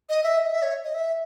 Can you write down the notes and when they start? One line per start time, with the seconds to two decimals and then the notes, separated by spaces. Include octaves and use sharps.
0.09 D#5
0.24 E5
0.38 D#5
0.51 E5
0.62 C#5
0.84 D#5
0.94 E5